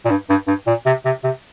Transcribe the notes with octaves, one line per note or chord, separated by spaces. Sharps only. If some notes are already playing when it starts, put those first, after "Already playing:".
A#2
G2
G2
G2
A#2
C3
C3
C3